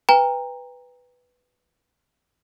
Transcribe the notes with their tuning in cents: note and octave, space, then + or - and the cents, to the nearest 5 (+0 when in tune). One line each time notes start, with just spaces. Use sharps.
B4 +0 G5 +35 A#5 +0